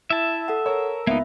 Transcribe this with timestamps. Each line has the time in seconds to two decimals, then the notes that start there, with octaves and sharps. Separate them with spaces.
0.10 E4 E5 A5
0.48 A4 F#5
0.66 A#4 C#5
1.07 C#2 A#3 B3 D#4 E5